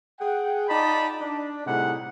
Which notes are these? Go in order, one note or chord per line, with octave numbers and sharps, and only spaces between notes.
G#4 F#5 G5
D#4 F4 D5 D#5 A5 B5
D4
A2 C3 G3 D#4 G#4 F#5